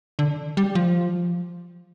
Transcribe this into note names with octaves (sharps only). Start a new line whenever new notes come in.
D3
G3
F3